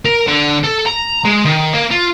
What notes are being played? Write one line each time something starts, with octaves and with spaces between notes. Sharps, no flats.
A#4
D3
A4
A#5
G#3
D#3
A#3
F4